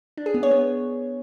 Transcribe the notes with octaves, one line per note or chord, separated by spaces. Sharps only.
D4
G#4
B3
C#5
B3